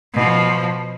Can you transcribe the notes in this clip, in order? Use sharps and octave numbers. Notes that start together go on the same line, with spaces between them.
B2 F3